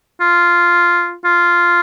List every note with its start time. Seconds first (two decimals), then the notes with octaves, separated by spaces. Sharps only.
0.21 F4
1.25 F4